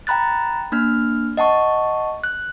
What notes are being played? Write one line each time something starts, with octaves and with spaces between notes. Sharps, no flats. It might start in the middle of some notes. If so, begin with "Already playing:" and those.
G5 A#5 B5 F#6 A6
A#3 D4 F6
D#5 F#5 A5 C#6
F#6